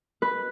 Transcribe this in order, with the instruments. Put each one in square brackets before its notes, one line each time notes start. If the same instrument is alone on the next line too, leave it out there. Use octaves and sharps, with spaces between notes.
[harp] B4